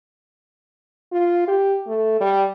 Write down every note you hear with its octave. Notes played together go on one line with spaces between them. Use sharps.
F4
G4
A3
G3